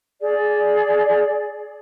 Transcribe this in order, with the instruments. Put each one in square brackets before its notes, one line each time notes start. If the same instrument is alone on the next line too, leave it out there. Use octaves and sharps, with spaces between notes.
[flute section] G#4 D5